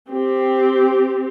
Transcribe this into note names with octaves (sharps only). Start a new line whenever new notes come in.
C4 G4